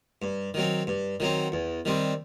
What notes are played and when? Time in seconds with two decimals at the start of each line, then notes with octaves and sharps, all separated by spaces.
0.22 G2
0.54 D#3 F#3 C4
0.87 G2
1.20 D#3 F#3 C4
1.52 E2
1.85 D#3 G3 C4